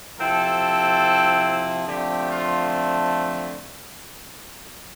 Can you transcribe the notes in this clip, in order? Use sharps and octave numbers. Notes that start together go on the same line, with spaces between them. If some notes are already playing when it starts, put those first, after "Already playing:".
C3 F3 C4 E4 A4
D3 F3 A3 C4 G4
F4